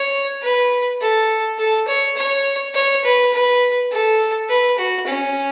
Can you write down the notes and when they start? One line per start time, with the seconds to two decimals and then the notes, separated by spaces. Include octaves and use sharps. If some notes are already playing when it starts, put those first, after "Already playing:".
Already playing: C#5
0.42 B4
1.01 A4
1.58 A4
1.88 C#5
2.16 C#5
2.74 C#5
3.04 B4
3.32 B4
3.91 A4
4.49 B4
4.78 F#4
5.07 C#4